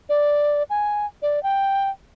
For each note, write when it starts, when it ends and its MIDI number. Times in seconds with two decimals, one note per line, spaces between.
0.09 0.63 74
0.70 1.06 80
1.22 1.42 74
1.43 1.90 79